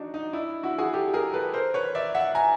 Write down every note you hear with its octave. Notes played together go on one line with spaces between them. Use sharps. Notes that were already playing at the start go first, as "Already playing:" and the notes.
Already playing: D4 D#4 F#4
D#4
D4 E4
E4 F#4
F#4 G#4
G4 A4
G#4 A#4
A4 B4
A#4 C5
B4 C#5
D5 E5
E5 F#5
G#5 A#5